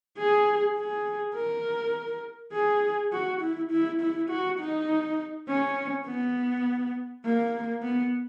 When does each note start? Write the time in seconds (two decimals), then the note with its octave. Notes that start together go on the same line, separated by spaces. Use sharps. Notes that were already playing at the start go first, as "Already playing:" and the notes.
0.18 G#4
0.77 G#4
1.35 A#4
2.53 G#4
3.13 F#4
3.41 E4
3.72 E4
4.01 E4
4.30 F#4
4.60 D#4
5.48 C#4
6.06 B3
7.25 A#3
7.83 B3